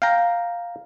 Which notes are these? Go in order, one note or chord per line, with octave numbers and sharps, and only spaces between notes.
F5 G5 A#5